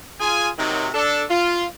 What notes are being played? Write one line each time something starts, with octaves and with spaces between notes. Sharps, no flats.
F4 G#4 G#5
C3 D#3 F#3
D4 A4
F4